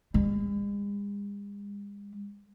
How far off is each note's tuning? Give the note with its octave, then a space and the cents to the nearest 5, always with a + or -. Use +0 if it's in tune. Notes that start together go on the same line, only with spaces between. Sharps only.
G#3 -45